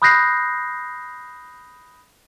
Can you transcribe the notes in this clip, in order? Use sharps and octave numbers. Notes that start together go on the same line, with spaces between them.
B5 D#6 F#6 G6 A#6 C7